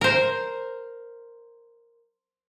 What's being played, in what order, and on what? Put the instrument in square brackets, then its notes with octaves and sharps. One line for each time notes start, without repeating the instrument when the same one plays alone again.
[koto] A#4 C5